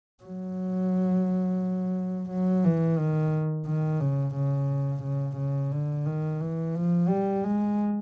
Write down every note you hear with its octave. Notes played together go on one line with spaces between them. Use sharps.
F#3
F#3
E3
D#3
D#3
C#3
C#3
C#3
C#3
D3
D#3
E3
F3
G3
G#3